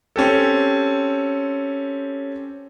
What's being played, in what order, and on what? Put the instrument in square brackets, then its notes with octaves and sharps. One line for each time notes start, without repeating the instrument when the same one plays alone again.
[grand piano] C4 C#4 G4 A4